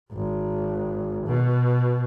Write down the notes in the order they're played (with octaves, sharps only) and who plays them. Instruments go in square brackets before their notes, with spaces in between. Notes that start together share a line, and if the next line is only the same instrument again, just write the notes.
[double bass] G#1
B2